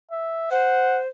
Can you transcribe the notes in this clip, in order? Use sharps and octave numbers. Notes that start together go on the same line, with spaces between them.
E5
C5 F#5